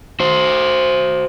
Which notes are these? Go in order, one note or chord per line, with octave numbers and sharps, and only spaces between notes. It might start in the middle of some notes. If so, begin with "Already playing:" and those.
F#4 C5